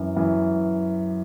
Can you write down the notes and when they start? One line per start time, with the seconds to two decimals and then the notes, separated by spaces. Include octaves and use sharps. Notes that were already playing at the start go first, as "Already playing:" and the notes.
Already playing: F#2 E3
0.16 F#2 E3